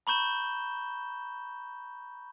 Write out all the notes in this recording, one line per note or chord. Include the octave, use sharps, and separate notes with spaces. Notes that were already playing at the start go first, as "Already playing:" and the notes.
A#5 B5 C#6 G6 E7 G7